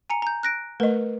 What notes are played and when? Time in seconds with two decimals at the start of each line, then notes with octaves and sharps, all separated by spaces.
0.10 G#5 A#5 C#7
0.22 A#5 G6
0.43 F#6 A#6 D7
0.80 A3 A#4 B4 D#5